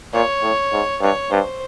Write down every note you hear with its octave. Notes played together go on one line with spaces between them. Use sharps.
A#2 C#5
A2
G#2
G2 C#5
G2 C5